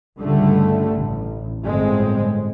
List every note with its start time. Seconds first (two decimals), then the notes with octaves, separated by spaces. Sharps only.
0.20 C#2 G2 D3 G3 A3
0.95 A1
1.64 G1 A2 G#3 C4